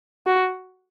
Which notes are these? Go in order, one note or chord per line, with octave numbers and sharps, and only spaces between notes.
F#4